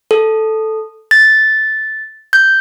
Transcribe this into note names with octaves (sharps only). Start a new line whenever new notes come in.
A4
A6
G6